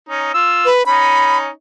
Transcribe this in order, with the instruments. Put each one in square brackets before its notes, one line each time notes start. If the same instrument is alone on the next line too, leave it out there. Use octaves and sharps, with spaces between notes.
[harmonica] C#4 D#4
F4 E6
[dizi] B4
[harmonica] C#4 D#4 [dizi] B5